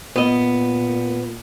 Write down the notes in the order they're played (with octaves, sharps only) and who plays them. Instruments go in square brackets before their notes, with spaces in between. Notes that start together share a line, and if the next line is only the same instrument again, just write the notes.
[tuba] A#2 [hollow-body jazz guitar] B3 D#5